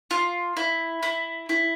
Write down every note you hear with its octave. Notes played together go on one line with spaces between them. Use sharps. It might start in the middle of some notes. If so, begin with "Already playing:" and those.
F4
E4
E4
E4